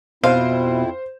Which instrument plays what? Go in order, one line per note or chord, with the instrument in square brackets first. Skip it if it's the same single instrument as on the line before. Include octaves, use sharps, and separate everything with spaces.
[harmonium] F2 C4 E4 [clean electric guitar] B2 [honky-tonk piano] C5 [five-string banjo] F5